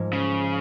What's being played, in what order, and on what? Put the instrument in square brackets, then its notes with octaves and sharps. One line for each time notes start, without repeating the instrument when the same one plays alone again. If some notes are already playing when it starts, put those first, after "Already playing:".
Already playing: [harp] G#2 F3 G#3 A#3
[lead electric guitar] C#3